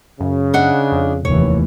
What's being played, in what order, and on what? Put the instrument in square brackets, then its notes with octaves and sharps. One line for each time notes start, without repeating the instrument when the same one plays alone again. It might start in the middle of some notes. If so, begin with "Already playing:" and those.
[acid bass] F#2 [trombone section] C#3
[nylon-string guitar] D4 D#5 F#5
[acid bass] F2
[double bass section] F1 D#2 E3 [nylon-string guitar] C#5